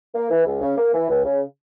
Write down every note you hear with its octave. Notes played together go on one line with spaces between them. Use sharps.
A#3
E3
C#2
C#3
A#3
E3
C#2
C#3